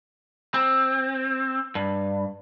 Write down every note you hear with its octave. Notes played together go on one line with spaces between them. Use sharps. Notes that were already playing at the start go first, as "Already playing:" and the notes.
C4
G2